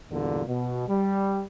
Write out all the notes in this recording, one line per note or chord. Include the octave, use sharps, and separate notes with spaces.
E2 G2 A#2 D3
B2
G3